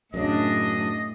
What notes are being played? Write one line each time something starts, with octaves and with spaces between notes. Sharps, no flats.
F#2 A2 C#3 D4 D#5